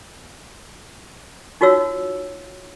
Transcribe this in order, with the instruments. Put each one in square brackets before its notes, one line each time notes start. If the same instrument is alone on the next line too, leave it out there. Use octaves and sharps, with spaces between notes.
[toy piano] D#4 F4 F#4 C#5 E6